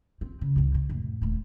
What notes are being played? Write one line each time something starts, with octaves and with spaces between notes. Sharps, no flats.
C4
C#3
C#2 G2
C3
F2 A2
D#1 A3